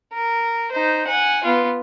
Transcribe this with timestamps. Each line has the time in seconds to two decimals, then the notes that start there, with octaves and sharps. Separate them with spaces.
0.12 A#4
0.71 D#4 C5
1.07 F#5 G#5
1.44 B3 F4